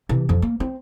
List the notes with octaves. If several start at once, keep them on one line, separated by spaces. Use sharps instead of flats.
C3 E3
F2 F3
A#3
C4